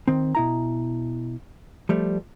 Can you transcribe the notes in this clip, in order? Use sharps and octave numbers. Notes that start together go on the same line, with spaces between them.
D#3 C4
B2 E4 A#5
F3 G3 A3